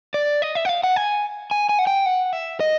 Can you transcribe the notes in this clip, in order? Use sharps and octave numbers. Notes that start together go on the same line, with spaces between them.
D5
D#5
E5
F#5
F5
F#5
G#5
G#5
G#5
F#5
G5
F#5
E5
D#5